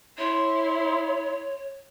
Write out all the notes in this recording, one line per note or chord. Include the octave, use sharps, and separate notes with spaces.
E4 C#5 C6